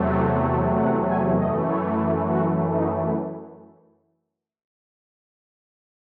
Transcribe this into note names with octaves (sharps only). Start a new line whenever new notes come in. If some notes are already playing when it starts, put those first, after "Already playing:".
Already playing: E2 C3 F#3 A3
A4
A4
F#5
G#5
F#2 E3 A3 D#5
C#5
F#4
D#4